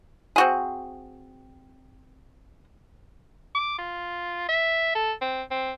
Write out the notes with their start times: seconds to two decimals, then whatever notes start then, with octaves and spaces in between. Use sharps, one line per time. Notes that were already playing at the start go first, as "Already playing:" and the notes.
0.36 C4 F#4 G#4
3.55 D6
3.79 F4
4.49 E5
4.95 A4
5.21 C4
5.51 C4